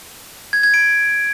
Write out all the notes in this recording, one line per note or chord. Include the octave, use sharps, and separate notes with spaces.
G#6
G#6
D7